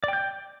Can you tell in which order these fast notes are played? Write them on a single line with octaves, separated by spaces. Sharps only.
D5 G5 G6